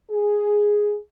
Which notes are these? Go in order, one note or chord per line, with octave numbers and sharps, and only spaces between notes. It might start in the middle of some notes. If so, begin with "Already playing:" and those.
G#4